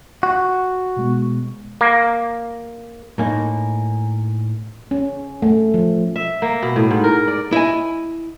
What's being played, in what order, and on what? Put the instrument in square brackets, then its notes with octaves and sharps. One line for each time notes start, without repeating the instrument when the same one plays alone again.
[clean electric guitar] F#4
[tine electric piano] B2 G#3 B3
[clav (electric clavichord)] A#3
[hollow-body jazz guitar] A2 A#3 D#4 [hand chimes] G#5 A#5
[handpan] C#4
A3
F3
[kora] E5
A#3
B2
A2
G#2
A#4
D5
[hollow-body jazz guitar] E4 D#5 G#5